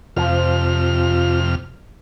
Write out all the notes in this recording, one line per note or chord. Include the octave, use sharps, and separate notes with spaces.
F2 C3 F3 F6